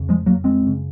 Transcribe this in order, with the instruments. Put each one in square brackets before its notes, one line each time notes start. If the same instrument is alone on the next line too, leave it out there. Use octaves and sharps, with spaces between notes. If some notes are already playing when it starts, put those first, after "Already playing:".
Already playing: [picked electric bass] F2 C#3
F3 G#3
F#3 A#3
G#3 C4
F#2 C#3